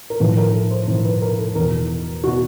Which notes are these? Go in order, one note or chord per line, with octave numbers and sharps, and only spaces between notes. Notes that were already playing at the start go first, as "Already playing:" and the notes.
A#4
A2 F3 B4
A#4
A4
C5
A2 F3 C5
B4
A#4
A4
E2 B2 A#4
F#4
B2